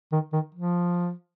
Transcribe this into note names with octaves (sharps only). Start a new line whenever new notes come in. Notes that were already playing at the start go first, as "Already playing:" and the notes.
D#3
D#3
F3